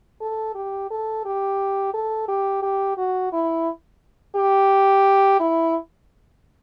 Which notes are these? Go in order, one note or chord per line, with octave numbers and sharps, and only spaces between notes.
A4
G4
A4
G4
A4
G4
G4
F#4
E4
G4
E4